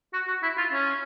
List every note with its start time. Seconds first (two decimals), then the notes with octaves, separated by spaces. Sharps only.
0.13 F#4
0.28 F#4
0.43 E4
0.58 F4
0.72 C#4